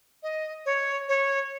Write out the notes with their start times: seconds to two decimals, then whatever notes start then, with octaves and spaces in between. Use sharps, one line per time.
0.23 D#5
0.66 C#5
1.08 C#5